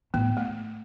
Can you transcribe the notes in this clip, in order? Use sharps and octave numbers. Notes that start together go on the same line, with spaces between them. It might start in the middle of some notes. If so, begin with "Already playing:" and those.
A2 B3
A3